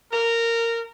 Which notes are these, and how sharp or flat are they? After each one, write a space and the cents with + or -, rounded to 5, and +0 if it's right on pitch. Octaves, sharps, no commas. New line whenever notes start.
A#4 -15